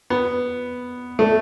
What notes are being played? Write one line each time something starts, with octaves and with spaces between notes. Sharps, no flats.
B3
A3